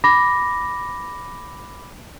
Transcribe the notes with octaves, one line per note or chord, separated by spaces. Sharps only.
B5 D6 A#6